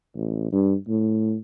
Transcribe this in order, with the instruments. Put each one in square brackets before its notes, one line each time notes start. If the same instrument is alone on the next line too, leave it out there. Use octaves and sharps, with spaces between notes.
[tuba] A1
G2
A2